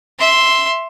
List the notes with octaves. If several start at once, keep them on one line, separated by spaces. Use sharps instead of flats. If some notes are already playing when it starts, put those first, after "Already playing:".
E5 C6